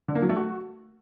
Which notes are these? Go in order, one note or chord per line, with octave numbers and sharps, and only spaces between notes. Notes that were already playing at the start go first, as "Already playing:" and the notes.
D3
A#3
F#3
A3
F#4